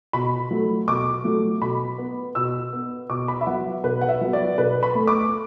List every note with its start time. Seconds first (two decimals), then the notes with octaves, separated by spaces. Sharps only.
0.13 B2 B5
0.51 F#3 A3
0.88 B2 D6
1.24 F#3 A3
1.62 B2 B5
1.98 B3
2.35 B2 E6
2.73 B3
3.10 B2 D6
3.28 B5
3.41 E5
3.47 F#3 B3 F#5
3.84 B2 B4
4.01 F#5
4.09 E5
4.21 F#3 B3
4.33 D5
4.58 B2 B4
4.83 B5
4.95 A3
5.07 D6